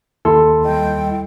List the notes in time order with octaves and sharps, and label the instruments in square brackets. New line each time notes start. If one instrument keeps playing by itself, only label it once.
[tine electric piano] D#2 E4 C6 [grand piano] A4
[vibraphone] G3 D#5 [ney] G5